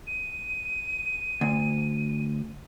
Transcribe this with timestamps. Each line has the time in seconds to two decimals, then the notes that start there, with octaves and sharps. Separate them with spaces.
0.07 D#7
1.41 D2